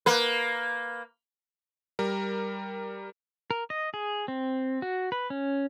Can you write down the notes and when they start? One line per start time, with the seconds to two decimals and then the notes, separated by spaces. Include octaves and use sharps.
0.06 A#3 B4
1.99 G3 A#4
3.51 A#4
3.70 D#5
3.94 G#4
4.28 C4
4.82 F#4
5.12 B4
5.30 C#4